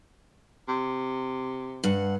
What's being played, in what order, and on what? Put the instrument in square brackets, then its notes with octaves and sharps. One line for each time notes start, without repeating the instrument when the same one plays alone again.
[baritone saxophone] C3
[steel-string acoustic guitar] G2 F#5